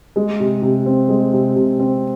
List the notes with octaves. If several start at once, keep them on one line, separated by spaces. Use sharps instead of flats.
G#3
C3
C3
C4
G#3
C3
C3
C4